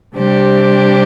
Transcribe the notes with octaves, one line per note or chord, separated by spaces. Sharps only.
C3 G3 D4 G4 C5